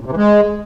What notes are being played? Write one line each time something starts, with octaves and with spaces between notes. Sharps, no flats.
A#2
C3
E3
G#3